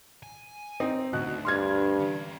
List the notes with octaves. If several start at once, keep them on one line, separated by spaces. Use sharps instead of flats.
G#5
C4 D#4
D2 B2 F#6
G2 C6 F6 G#6
C#4 G4